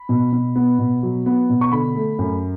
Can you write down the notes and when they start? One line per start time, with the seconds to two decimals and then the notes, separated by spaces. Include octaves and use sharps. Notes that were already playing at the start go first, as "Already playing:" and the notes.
Already playing: B5
0.09 B2
0.33 B2
0.56 B3
0.79 B2
1.03 F#3
1.26 B3
1.49 B2
1.61 C#6
1.72 D3 B5
1.95 A3
2.19 F#2